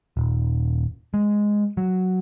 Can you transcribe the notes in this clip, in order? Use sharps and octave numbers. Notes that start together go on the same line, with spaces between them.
D#1
G#3
F#3